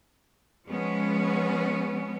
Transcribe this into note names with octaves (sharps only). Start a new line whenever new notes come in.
F3 G#3 B3 C#4